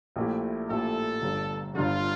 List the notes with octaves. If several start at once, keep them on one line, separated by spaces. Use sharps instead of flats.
A#1 A#2 A3 E4 G4
A#1 A#2 A3 E4 G4 A4
G1 G2 D3
G1 G2 D3 F4